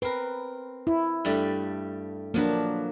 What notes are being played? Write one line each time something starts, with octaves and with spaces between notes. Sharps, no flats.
C4 A#4 B4
E4
G2 G3 A3
F3 F#3 A#3 D4 B4